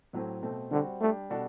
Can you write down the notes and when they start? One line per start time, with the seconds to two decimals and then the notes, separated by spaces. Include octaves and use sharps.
0.13 A2 F#3 A3 C4
0.43 B2 A3 C4
0.72 D3 G3 C4 F#4
1.01 G3 A3 D4 G4
1.30 B2 G3 D4 F#4 A4